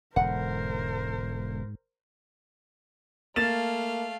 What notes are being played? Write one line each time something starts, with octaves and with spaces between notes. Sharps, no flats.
E1 G#2 D3 A#4 C5 F#5
A3 A#3 F5 A6 E7